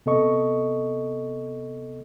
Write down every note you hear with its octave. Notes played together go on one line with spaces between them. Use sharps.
C3 B3 A4 D#5 C#6